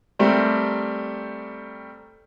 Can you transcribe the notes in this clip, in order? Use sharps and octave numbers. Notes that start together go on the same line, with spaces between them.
G3 A3 C4 G4 A#4